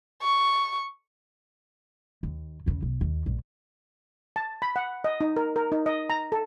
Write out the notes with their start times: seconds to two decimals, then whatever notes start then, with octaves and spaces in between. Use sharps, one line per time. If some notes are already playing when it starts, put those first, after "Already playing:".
0.22 C#6
2.23 D#2
2.66 E2 C#3
2.82 B1
3.01 D#2
3.26 A#1 G2
4.36 A5
4.62 B5
4.76 F#5
5.04 D#5
5.21 D#4
5.36 A#4
5.56 A#4
5.72 D#4
5.86 D#5
6.10 A#5
6.32 A4